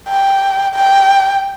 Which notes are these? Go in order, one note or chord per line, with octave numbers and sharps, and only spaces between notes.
G5
G5